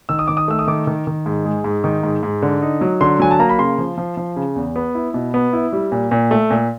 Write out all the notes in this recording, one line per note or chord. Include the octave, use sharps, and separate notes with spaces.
D#3 E6
D#6
D#3 D6
D#6
A3 E6
D#6
D#3 D6
D#3
D#3
G#2
G#3
G#2
D#3
G#2
G#2
D3
D#4
F#3
D3 C6
F#3 G#5
A5
A#3 A#5
B5
C#3 C6
F3
F3
F3
C#3
E2
B3
E4
B2
B3
E4
G3
A#2
A#2
A3
A#2